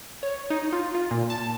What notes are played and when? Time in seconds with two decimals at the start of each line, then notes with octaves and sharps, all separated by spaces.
0.23 C#5
0.50 D#4
0.73 F4
0.95 F4
1.11 A#2
1.30 A5